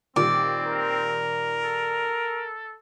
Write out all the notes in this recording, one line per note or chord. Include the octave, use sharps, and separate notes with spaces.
A#2 D#3 G3 C4 D5
A#4
A4